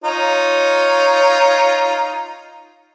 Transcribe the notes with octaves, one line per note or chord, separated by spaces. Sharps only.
D#4 F4 C#5